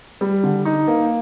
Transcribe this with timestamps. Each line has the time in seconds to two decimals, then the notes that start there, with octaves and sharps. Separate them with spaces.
0.21 G3
0.43 D3
0.65 D#4
0.88 A#3